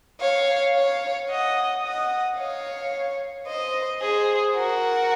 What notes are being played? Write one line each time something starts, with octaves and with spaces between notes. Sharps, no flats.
C#5 F5
C#5 F5
D#5 F#5
D#5 F#5
C#5 F5
C5 D#5
G#4 C5
F#4 A#4